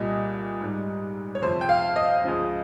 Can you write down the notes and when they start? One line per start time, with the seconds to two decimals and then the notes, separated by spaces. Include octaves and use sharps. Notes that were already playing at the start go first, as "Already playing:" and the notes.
Already playing: C2 A#2 G3 D#5
0.61 G#2 G3
1.35 C#5
1.42 F2 C3 F3 C5
1.61 G5
1.69 F5
1.96 D#5
2.24 C#2 C#3 F3